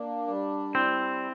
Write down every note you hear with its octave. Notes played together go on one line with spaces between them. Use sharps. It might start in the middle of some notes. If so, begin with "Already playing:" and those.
Already playing: A#3 D4
G3
C4 E4